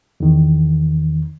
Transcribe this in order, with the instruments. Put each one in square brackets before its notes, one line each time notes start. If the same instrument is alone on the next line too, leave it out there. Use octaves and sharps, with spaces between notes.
[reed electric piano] E2 D#3